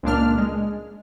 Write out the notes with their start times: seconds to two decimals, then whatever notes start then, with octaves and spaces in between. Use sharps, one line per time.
0.03 C#2 A#2 D4 F6
0.38 G#3